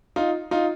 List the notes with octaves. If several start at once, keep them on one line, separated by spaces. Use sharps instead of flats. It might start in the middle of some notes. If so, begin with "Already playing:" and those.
D#4 F4
D#4 F4